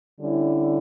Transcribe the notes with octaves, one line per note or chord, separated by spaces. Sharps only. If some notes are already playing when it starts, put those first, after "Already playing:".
D3 G3 C#4 E4